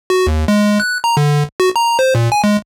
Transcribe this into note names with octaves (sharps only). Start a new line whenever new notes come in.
F#4
D#2
G#3
F#6
A#5
D3
F#4
A#5
C5
A#2
G#5
G#3